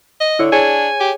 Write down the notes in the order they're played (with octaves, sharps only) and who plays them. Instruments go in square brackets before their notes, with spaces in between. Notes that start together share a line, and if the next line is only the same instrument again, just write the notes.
[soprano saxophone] D#5
[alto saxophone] D3 [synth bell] E4 C#5
[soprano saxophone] D4 [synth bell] G#4 C#5 [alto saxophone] G#5
[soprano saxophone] G4